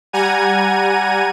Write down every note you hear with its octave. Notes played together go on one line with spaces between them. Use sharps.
G3 F#5 G#5 A#5 G#6 D#7